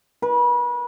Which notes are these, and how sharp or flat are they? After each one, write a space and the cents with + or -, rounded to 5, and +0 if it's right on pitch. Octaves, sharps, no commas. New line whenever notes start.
B4 -35